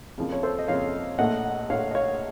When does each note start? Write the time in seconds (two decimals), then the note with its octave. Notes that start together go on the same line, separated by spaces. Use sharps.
0.18 F2 C#3 F3 A#3
0.32 C#5
0.43 A4 C5
0.59 D#5
0.68 F2 C#3 F3 A#3 C#5 F5
1.19 A#1 A#2 A3 D#5 F#5
1.69 A#1 A#2 A3 C#5 F5
1.91 D#5
1.95 C#5 F5